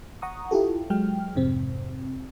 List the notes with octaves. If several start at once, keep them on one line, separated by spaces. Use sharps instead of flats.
F#5 A#5 C#6 D#6
E4 F4 G4 A4
F#3 G#3 G5 F6
F2 G#2 C3 C4